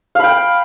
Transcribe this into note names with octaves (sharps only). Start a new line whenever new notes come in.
F5 G5 B5